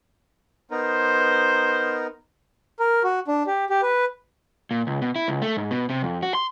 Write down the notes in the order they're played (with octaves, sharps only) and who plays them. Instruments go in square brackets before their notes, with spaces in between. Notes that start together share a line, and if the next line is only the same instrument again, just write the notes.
[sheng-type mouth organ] B3 D#4 A#4 [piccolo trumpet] C5
[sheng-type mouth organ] A#4
F#4
D4
G4
G4
B4
[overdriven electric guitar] A#2
C#2
B2
E4
C#2
A3
G#2
B2
C3
F2
F#4
C6